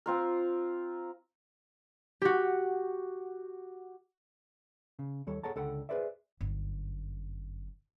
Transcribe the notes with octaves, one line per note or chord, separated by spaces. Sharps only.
C4 F4 A#4
F#4 G4
C#3
D#2 G3 A4 C#5
G#4 A4 C#5 F#5 A5 A#5
C#2 D3 A4 F#5 G5 B5
G#4 A4 B4 C5 D5 E5
G1 F#2